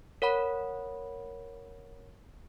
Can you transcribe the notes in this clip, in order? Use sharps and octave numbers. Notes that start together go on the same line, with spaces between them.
A#4 C#5 F#5 B5